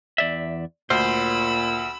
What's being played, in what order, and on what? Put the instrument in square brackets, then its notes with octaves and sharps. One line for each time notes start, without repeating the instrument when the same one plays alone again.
[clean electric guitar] E2 D5 E5
[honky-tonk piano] D2 [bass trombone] A#2 [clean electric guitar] C5 [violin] B5 E6